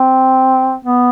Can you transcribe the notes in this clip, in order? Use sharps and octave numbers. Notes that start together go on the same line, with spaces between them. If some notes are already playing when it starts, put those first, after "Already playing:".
Already playing: C4
B3